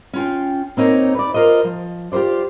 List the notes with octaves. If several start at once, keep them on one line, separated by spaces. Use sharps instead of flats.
C#4 F4 G5
A#3 C4 D#4 C#5
B4 D5
F4 A#4 C5 D#5
F3
F4 G4 A#4 C5 D5